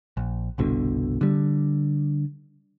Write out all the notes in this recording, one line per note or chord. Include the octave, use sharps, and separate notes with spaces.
A#1
G1 C2 B2 D3
D3 G3